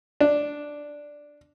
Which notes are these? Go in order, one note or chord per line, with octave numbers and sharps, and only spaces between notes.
D4